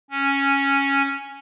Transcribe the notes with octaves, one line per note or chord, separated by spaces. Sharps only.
C#4